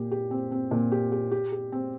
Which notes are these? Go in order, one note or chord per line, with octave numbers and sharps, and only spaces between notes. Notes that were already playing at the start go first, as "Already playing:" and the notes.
Already playing: A#2 G4
G4
C4
C4
A#2
G4
G4
G4
G4
C4